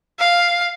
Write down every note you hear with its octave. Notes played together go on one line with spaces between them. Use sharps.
F5